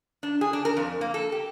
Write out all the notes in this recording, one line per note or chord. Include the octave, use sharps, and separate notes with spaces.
D4
G#4
D4
A#4
F2
A#3
A4
G4